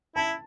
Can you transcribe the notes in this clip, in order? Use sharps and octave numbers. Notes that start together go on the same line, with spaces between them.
E4 A5